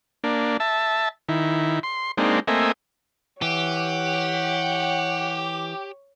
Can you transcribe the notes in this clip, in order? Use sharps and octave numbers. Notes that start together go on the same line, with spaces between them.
A#3 D4
E5 A5
D#3 E4
C6
G#3 A#3 C4 D4 D#4
A3 A#3 C4 D#5 E5 G#5
E3 G4 C#5 F#5